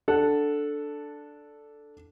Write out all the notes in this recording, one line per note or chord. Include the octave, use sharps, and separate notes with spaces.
D4 A4 F#5